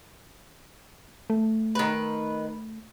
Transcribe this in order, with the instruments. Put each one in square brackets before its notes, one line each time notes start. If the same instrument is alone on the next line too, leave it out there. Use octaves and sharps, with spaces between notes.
[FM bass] A3
[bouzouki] D#3 B4